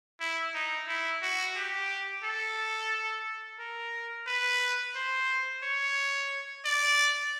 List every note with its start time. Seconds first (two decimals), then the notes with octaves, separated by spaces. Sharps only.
0.21 E4
0.54 D#4
0.88 E4
1.22 F#4
1.56 G4
2.24 A4
3.59 A#4
4.27 B4
4.95 C5
5.63 C#5
6.65 D5